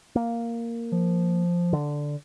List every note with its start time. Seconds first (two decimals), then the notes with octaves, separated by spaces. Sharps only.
0.16 A#3
0.92 F3
1.73 D3